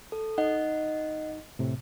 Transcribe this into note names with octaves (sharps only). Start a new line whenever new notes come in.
A4
D#4 D#5 F#5
A2 C3